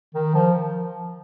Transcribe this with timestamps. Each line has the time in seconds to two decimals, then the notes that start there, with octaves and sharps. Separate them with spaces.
0.14 D#3
0.34 F3